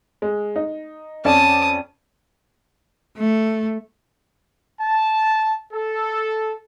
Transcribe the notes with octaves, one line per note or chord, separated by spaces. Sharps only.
G#3
D#4
F2 C#4 D5 A5 D#6
A3
A5
A4